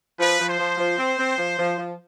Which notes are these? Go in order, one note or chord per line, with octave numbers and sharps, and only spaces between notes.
F3 B4
F3
C5
F3
F3
C4
C4
F3
F3
F3